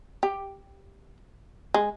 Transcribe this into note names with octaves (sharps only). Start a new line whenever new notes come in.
G4
G#3